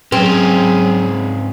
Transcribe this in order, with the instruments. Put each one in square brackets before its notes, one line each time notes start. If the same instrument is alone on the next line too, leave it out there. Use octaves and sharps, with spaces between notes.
[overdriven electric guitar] G#2 C#4 [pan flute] F#3 [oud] C4 [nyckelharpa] G#4